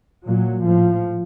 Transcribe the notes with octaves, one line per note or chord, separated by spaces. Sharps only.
A#2 F#3
A2 F3